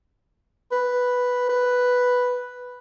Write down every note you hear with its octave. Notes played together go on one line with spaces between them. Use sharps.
B4
B4